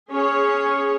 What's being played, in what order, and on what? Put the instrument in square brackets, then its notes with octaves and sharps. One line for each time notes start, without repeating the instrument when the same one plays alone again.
[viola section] C#4 G#4 C#5